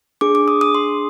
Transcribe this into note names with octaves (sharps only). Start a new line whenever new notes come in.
D4 G#4 D6
D6
D#6
D#6
C6